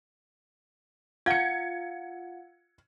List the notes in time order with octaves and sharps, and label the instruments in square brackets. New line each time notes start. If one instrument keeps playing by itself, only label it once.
[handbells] F4 F5 F#5 [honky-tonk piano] G#6 C#7